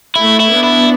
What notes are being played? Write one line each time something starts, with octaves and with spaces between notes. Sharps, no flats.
A3 E4
E4
B3 D4
E4